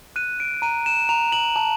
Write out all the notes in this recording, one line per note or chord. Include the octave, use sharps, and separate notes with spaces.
F#6 D#7
D7
A#5 D#7
E7
A#5 F7
F#7
A5